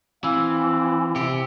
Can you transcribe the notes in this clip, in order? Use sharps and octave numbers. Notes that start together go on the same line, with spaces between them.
E3 C4 F5 E6
C3 G4